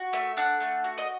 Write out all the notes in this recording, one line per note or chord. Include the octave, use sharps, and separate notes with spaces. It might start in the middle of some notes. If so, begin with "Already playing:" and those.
Already playing: F#4
A3 E5
D4 F#5
A3
F#4
D#5